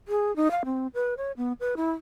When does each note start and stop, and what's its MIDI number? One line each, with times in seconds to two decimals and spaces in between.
0.08 0.34 68
0.36 0.51 63
0.51 0.63 77
0.65 0.87 60
0.94 1.14 71
1.17 1.32 73
1.37 1.53 59
1.60 1.75 71
1.77 1.91 64